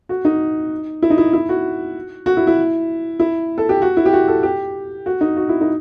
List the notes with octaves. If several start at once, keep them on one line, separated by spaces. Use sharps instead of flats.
F#4
D#4
E4
D#4
E4
E4
F#4
F#4
E4
E4
E4
A4
G4
F#4
E4
G4
F#4
A4
G4
F#4
D#4
F#4
E4
D#4